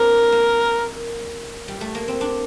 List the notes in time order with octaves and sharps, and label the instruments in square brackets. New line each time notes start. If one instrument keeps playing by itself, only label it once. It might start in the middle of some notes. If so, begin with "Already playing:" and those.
Already playing: [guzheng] A#3 C4 D4 [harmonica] A#4
[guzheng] A#3
G3
A3
A#3
C4
D4